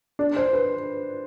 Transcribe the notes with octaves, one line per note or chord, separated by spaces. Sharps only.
D4
C5
B4